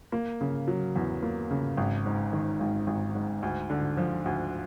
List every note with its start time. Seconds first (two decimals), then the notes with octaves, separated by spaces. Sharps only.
0.12 A#3
0.41 C#3
0.68 F#3
0.96 E2
1.22 A#3
1.51 C#3
1.77 G#1
2.06 G#2
2.33 D#3
2.60 G#1
2.87 G#1
3.15 G#2
3.43 D2
3.70 D3
3.97 F3
4.26 D2